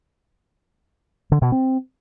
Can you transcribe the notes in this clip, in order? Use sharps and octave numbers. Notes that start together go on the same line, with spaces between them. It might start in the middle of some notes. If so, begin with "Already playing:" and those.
D3
B2
C4